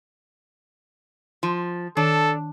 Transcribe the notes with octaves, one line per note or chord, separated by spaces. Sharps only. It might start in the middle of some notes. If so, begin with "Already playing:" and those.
F3
D#3 D4 A4